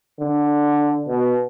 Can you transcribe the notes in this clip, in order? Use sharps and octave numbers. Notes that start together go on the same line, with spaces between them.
D3
B2